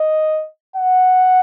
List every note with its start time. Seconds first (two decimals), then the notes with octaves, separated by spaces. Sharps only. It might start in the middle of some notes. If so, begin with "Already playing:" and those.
Already playing: D#5
0.76 F#5